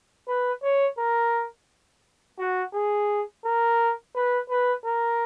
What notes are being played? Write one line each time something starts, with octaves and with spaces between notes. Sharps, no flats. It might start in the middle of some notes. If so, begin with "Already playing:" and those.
B4
C#5
A#4
F#4
G#4
A#4
B4
B4
A#4